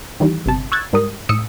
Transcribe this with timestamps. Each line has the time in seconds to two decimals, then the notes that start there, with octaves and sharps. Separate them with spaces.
0.20 D#3 E3 G3
0.46 G1 C3 A5
0.72 C#6 E6 F#6 G#6 A6
0.93 G#2 G3 A#4 D#6
1.29 A2 D#6 E6 C#7